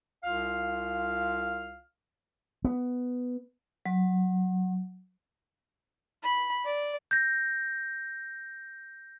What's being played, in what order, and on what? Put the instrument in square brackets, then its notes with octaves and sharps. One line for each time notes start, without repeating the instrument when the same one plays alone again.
[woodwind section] C2 F4 F5 F6
[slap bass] B3
[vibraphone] F#3
[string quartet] B5
D5
[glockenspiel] G6 A#6